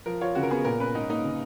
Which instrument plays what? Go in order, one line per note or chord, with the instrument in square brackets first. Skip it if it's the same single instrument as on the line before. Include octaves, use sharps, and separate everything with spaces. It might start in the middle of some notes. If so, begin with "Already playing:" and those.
[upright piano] F3 [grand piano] A#4
[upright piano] F4 [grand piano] C#5
[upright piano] C#3 [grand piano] F#4
[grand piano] A#4
[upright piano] B3 [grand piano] G#4
[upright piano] A#2 [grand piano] A#4
[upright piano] C#4 [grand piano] B4
[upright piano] G#2 [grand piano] D#4
[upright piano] A#3 [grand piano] D#4
[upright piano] C#3